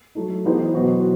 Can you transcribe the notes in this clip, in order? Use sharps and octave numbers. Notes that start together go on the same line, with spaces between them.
F#3 A3 D#4
E3 B3 D#4 G4 C5
B2 F#3 B3 F#4 C5